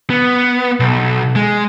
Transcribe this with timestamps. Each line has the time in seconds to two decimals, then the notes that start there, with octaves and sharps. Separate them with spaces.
0.10 B3
0.80 B1
1.36 G#3